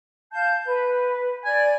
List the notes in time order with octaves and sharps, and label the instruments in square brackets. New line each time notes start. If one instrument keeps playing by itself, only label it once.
[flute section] F5 A5 G6
B4
[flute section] D5 [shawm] G#5